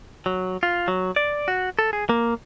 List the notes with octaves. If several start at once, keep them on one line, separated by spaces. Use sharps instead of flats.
F#3
F4
F#3
D5
F#4
A4
G#4
A#3